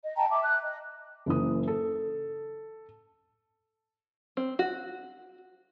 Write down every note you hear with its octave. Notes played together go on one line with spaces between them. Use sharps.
D#5
D#5 G5 A5 A#5
E5 A5 D6
F#6
D#5
F#1 F#2 E3 D#6
A4
C4
F#4